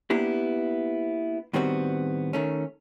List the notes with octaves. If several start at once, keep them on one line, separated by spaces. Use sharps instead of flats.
A#3 B3 D4 E4 G4
A2 D#3 G3 B3 C4 F#4
D#3 A3 C#4